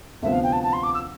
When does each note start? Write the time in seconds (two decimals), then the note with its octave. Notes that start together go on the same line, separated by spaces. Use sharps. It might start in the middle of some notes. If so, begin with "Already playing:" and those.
0.22 D2 C3 F3 B3 E5
0.33 F5
0.43 G5
0.53 A5
0.63 A5
0.73 C6
0.83 D6
0.94 E6